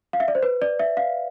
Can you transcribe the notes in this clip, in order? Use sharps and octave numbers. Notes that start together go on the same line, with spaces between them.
F5
E5
D5
C5
B4
D5
E5
F5